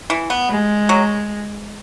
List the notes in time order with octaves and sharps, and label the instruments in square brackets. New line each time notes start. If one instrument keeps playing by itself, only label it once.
[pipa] E3
B3
[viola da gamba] G#3
[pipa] F#3